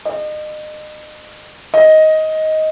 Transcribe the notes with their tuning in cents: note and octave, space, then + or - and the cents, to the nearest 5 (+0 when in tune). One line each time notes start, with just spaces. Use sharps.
D#5 -35
D#5 +10